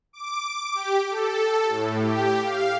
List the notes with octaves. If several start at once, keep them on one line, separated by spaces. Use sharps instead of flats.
D6
G4
A4
A2
G4
F5